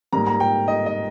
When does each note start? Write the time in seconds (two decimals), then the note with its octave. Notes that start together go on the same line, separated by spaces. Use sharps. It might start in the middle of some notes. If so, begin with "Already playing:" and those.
0.13 G#2 G3 A#3 A#5
0.27 A#5
0.40 G5
0.68 D#5
0.86 D#5